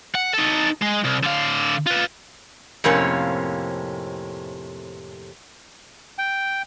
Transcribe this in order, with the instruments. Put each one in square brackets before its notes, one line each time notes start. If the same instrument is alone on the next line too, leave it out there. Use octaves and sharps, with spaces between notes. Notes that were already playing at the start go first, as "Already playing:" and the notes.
[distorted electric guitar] F#5
D#4 A4
G#3
C2
D3 F5
F4 B4
[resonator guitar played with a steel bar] F2 A2 C3 A#3 C#4
[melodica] G5